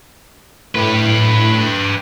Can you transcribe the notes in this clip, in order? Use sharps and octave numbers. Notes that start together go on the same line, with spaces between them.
A2 G4 B4